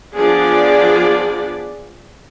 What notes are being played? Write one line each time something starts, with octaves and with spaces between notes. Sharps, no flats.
F3 B3 D4 G#4 D5